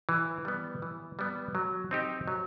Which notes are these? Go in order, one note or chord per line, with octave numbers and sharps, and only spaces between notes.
E3
G3 B3
E3
G3 B3
F#3
C4 D#4 G4
F#3